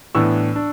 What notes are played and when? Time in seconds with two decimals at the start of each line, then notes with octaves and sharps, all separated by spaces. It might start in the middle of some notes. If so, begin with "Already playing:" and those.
0.15 A2 E3 B3 D4 C#6 E6
0.56 D4